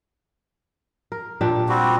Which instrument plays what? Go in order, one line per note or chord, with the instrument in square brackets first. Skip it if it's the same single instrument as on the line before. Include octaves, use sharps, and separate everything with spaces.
[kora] A#4
A#2 D4 G4
[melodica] G3 C4 F#4